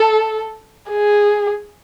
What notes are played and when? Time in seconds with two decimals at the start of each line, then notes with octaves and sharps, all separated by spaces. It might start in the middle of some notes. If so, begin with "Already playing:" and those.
Already playing: A4
0.91 G#4